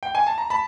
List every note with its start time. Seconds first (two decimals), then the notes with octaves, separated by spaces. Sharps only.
0.03 G5
0.15 G#5
0.27 A5
0.38 A#5
0.50 A5 B5